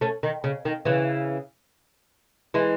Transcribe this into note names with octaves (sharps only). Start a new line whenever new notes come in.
A3 C#4
D#3
C#3
D#3
C#3 E3
E3 G#3